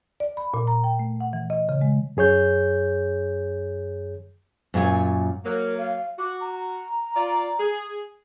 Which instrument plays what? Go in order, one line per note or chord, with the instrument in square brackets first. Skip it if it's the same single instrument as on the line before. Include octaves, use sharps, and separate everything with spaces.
[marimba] D5
B5
A#2
A#5
G5
A3
F#5
E3
D#5
C#3
G#3
[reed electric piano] F#2 G#4 C#5 G6
[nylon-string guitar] F#2 A#2 C#5 G#5
[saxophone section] F#3 A#3 [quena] A#4
[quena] F5
[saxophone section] F#4 [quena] D6
[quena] A#5
[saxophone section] F4 D5
G#4